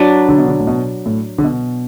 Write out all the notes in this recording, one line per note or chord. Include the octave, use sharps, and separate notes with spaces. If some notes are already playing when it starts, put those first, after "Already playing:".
Already playing: F#3 D4 B4
D3
B2
D3
A2
B2
A2
D3
B2